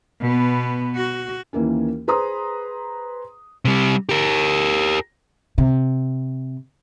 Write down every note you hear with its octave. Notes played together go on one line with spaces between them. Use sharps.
B2 B3
F#4
D#2 E3 A#3 C#4
G#4 B4 C5 A#5 C6 D#6
C3 G3
G4 A#4
C3